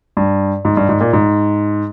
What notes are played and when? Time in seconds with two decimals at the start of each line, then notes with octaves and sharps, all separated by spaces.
0.17 G2
0.65 G#2
0.77 G2
0.89 G#2
1.01 A#2
1.13 G#2